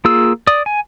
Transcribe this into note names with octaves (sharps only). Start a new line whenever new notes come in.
A#3 F4 G#4 E6
D5 D#6
G#5